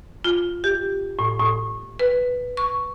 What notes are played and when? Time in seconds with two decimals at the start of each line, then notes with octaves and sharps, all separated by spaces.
0.24 F4
0.64 G4
1.19 A2
1.40 A2
1.99 B4
2.57 C#6